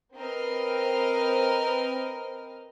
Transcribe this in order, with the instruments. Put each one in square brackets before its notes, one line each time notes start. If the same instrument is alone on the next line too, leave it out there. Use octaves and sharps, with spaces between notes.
[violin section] C4 A#4 B4 D#5 F6